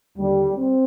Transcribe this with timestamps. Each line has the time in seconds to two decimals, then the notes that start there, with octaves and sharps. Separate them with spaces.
0.17 D#2 D3 G3
0.56 C4